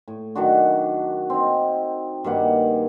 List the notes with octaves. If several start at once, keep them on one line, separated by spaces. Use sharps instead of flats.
A2
D#3 F#3 D4 F#4
C4 D#4
G2 D#3 A#3 F#5